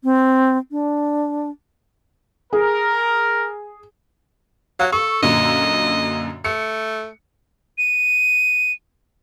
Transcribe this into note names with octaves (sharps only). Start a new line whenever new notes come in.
C4
D4
G#4 A#4
F#3 F5
A4 C#6
F#2 A#2 D3 D#5
A3 C#7
D#7